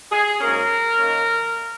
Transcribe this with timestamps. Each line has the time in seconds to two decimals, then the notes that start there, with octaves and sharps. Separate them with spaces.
0.12 G#4
0.40 G#2 F#3 A#3 C#4 A#4
0.99 D#3 A#3 C#4